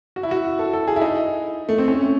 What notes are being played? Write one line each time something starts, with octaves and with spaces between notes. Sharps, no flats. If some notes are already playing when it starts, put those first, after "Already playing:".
F#4
E4
F#4
A4
A4
G#4
E4
D#4
A3
C4
C#4